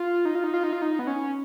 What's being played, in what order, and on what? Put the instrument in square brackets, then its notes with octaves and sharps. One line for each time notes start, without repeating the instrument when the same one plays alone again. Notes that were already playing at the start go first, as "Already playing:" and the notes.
Already playing: [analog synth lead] F4
D#4
F4
D#4
F4
D#4
F4
D#4
B3
C#4